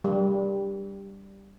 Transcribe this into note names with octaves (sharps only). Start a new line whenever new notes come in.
G3